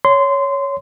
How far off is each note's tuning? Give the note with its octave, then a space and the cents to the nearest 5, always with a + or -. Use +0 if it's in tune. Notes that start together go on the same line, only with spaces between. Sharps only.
C#5 +5 C6 -20